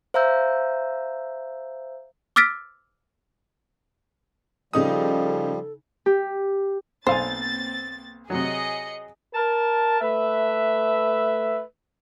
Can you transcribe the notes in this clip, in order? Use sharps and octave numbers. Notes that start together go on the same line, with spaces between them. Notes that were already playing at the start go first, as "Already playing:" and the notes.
C5 E5 F5 A#5 E6 G6
D6 E6 F6 A6 B6 D7
C#3 F3 G3 D#4 A4 D#6
G4
B1 A#3 C4 C5 F5 G#5 A6
C3 F#3 G#4 D#5 C#7
A#4 A5
A3 B4 E5